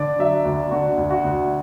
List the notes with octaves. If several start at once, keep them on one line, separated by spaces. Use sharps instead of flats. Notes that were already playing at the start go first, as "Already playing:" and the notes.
Already playing: D3 D5
F#3 E5
D2 D5
D3 F#4
D2
F#4
D2